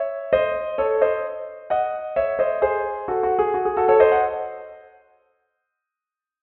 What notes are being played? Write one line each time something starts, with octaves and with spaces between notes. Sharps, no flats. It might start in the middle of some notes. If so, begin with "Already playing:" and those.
Already playing: C#5 E5
C5 D#5
A4 C#5
C5 D#5
D#5 F#5
C#5 E5
C5 D#5
G#4 C5
F#4 A4
F#4
G#4
F#4
G#4
F#4 A4
A4 C#5
C5 D#5
F#5